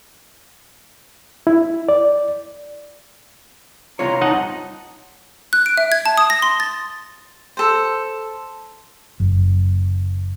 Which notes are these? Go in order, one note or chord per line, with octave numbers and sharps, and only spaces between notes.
E4
D5
C2 F4 C#5 A#5 C6
D#4 D#5 F#5 A5
F#6
D7
E5
G#6
A5
D#6
A#6
C6
A6
A4 C5
F#1